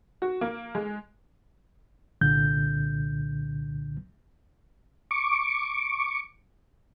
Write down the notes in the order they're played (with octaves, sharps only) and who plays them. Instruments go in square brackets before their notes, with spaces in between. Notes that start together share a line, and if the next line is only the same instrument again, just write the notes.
[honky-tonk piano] F#4
A#3
G#3
[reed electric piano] C2 A#2 D3 G6
[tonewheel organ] C#6 D6